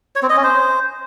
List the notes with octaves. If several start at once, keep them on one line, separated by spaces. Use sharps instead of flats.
C#5
C4
D#5
C#4
C5